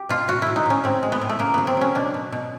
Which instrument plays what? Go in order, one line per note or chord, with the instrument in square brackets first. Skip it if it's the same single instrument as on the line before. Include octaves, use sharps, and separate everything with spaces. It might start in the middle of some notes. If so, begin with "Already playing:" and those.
Already playing: [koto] G4
B2 F4
A2 F#4
A2 E4
D#4
A2 C#4
A2 C4
G#3
B3
A2
A3
C#3 A#3
F#3 B3
C4
F#3 C#4
B2 D4
B2
B2